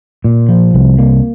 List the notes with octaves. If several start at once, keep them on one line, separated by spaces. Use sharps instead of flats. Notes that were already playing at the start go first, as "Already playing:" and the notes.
A#2
F3
C2
A#3